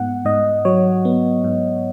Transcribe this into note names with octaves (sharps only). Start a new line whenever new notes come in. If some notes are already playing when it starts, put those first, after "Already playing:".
Already playing: G#2 B3 F#5
G#2 D#5
F#3 C#5
B3
G#2